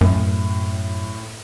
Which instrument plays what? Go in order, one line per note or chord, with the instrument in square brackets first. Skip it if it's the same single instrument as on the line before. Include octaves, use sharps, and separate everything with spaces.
[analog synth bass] F#2 [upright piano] A2